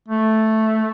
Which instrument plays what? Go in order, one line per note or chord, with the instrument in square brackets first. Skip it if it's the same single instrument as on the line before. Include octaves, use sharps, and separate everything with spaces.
[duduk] A3